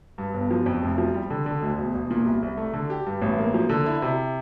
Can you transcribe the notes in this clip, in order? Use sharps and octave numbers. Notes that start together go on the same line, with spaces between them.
G2
G1
F3
F2
F1
F3
G3
D3
D3
D2
E1
E1
A#2
C2
C2
A3
D3
G4
G2
A1
A#3
F3
D3
E4
C3